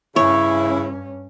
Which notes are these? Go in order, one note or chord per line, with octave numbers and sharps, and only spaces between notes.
G2 C#3 C#4 E4 C#5